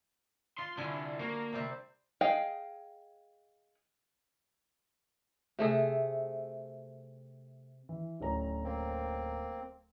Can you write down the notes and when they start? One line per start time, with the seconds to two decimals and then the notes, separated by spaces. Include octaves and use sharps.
0.58 F4 C6
0.77 C2 D3 G#5
1.19 A#3 F#4
1.52 C3 G3 C4
2.21 G#4 D#5 F5 G5
5.59 C3 A3 G#4
7.89 E3
8.20 D1 C#4 A#5
8.64 A#3 C4